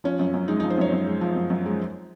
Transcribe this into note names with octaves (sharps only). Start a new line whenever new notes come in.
F3 C#4
F#2
F#2
G#3 D#4
F3 D#4
C5
F#2 C#5
F#2
G#3
F3
F#2
F#2
G#3